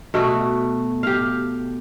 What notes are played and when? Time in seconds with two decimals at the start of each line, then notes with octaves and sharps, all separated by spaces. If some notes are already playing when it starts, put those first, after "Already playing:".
0.14 B2 A3 F#4
1.03 G4 F5